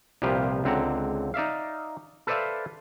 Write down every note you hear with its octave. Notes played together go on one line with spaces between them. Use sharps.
C2 A#2 F3 G4 B4 F5
C#2 D3 C4 F#5 A#5
D#4 D5 E5 F5
A4 B4 C5 D5 E5 F5